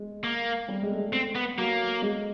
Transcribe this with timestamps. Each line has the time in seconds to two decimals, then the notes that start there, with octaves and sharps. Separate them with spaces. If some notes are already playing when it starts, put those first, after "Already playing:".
Already playing: G#3
0.24 A#3
0.68 G3
0.83 G#3
0.91 A3
0.98 G#3
1.13 C4
1.35 B3
1.58 F#3 A#3
2.02 G#3